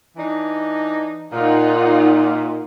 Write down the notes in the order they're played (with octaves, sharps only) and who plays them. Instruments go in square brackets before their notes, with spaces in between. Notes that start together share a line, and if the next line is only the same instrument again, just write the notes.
[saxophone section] E3 D4 D#4
[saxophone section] A#2 [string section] D#4 F4 F#5